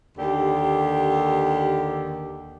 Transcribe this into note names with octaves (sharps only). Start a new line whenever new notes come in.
D#2 D3 G4